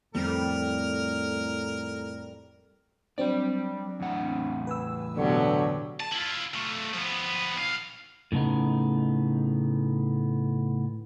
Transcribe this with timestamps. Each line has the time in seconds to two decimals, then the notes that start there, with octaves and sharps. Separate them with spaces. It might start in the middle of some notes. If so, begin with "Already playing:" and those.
0.15 F2 A2 G3 A#4
3.18 F#3 G3 C4 D4 D5
4.00 E2 A2 F#5
4.67 B4 G#5 E6
5.16 B2 D3 F#3 G4
6.00 A5
6.12 E4 F4
6.54 A3 F4
6.94 F3 B3
7.55 B1 F5
8.32 A2 C#3 A3 B3 D#4